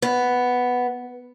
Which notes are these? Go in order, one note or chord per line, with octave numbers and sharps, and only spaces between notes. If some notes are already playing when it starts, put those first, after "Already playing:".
B3